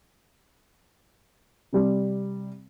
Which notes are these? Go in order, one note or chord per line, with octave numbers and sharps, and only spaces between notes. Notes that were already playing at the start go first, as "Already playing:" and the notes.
C3 G3